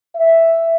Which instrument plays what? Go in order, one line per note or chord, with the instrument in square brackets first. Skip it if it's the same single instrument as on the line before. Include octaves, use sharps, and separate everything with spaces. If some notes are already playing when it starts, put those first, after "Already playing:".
[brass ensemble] E5